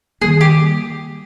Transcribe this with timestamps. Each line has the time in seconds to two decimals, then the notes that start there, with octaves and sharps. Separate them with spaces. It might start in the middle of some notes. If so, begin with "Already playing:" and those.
0.21 D#3 G3 A#3 G#4
0.41 G4